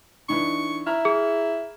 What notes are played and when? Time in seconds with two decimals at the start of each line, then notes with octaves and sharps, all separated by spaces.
0.29 E3 D4 D#4 C#6
0.87 E4 A#5 F6
1.05 G#4